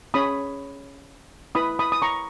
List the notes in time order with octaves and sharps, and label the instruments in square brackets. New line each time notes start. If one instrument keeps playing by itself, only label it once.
[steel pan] C#4 G#4 C#5 B5 D#6
E4 B4 B5 D#6
B5 D#6
D#6
A#5 C#6